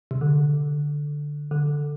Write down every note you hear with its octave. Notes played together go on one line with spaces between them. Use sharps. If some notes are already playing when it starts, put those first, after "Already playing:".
C3
D3
D3